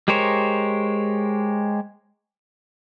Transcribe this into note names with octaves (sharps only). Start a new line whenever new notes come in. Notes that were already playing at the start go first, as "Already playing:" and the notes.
G#3 G4 A#4 C5 C#5